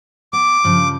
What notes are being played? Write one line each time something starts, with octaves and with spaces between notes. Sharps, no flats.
B3 D6
G2 C#3 F3